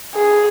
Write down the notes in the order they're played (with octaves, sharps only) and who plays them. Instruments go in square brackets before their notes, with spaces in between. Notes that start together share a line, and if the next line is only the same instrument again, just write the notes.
[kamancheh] G#4